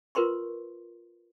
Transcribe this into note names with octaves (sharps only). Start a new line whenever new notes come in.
F4 A#4 B4 C6 C#6